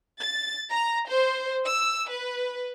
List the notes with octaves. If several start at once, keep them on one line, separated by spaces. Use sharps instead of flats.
A6
A#5
C5
E6
B4